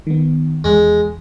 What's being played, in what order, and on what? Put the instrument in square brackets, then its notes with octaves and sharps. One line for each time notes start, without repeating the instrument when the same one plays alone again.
[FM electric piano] D#3 B3
[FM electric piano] E2 [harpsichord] G#3